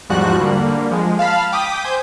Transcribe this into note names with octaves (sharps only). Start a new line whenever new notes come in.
E2 G#2 F3 G3 F#4 F#6
D3 G3 A#3
F3 G#3
F5 A5 B5 F6
G5 D6 D#6 B6
C5 G#5 G6